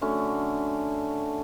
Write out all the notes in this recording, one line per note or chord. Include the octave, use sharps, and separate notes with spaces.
D3 F#3 A3 C#4